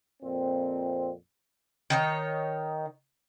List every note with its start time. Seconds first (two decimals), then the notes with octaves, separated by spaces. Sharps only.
0.23 F2 A#2 C4
1.90 D#3 D#4 C#5